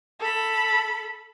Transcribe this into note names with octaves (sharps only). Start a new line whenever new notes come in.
A4 B5